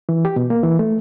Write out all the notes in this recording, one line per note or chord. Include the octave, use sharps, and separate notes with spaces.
E3
G4
B2
A#3
E3
A3